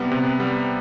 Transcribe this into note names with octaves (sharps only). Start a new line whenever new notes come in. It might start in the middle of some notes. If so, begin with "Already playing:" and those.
Already playing: C3 G3 B3
C3
G3 B3